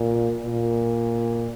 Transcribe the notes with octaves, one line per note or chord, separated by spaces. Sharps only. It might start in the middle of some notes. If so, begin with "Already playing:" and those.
Already playing: A#2
A#2